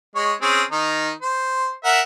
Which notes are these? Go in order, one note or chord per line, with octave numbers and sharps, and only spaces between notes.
G#3 C#5
C4 C#4 G#4
D#3 D#4
C5
A#4 E5 F#5